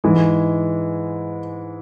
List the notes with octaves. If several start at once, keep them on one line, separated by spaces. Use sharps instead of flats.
G#2 E3 G#3